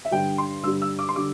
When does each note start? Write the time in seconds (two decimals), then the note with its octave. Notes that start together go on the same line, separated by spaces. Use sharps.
0.05 E5
0.11 G2 D3 G3 G5
0.38 C6
0.64 G2 D3 G3 E6
0.82 E6
0.99 D6
1.09 C6
1.16 D3 G3 D6